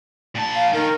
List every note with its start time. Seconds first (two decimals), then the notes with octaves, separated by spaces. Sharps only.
0.36 A#2 A5
0.55 F5
0.74 D#3 A#4